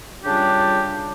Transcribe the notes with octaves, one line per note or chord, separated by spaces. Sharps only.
C#3 G3 D4 F4 G4